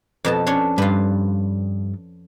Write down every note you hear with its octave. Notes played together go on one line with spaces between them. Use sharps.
F2 B2 A5
C#4 D4 C#5
G2 F4 B4